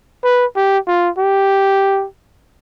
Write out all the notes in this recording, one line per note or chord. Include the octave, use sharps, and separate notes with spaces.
B4
G4
F4
G4